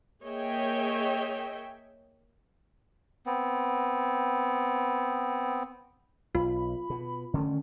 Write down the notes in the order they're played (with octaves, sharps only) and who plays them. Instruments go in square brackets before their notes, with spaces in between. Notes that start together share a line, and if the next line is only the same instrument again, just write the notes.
[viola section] A#3 G#4 C#5 D#5 E5 G5
[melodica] B3 C4
[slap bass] B1 [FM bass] F4 [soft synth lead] B5
[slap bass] B2
[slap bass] D3 D#3 A3 [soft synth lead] C#4